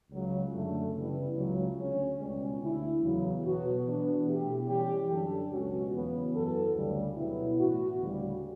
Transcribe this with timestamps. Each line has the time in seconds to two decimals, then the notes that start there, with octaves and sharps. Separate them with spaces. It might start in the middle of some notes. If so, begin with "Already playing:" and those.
0.10 C#2 C#3 F#3
0.53 F#2 D3 A3
0.93 C#3 E3 G3 B3 E4
1.35 C#2 C#3 F#3
1.77 D2 C#3 F#3 C#4
2.18 C#2 B2 G3 C#4
2.59 D2 D3 A3 E4
3.00 E2 C#3 F#3
3.42 B2 F#3 B3 F#4 A4
3.84 E3 B3 D4
4.25 B2 A3 E4 G4
4.66 E3 G3 C#4 G4
5.09 F#2 D3 G3 D4 A4
5.51 C#2 B2 F#3 C#4 F#4
5.92 E2 C#3 F#3 B3
6.33 F#2 E3 B3 F#4 A4
6.74 D2 C#3 G3
7.16 B2 F#3 B3 E4
7.58 A2 E3 B3 F#4
7.99 D2 C#3 G3